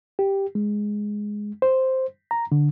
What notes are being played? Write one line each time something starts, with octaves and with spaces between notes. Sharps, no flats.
G4
G#3
C5
A#5
D3